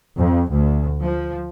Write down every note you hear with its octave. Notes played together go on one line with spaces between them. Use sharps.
F2
D2
F3